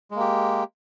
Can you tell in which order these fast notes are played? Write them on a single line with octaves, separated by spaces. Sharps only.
G#3 A#3 G4